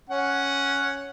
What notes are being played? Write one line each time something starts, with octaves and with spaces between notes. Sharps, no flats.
C#4 F#5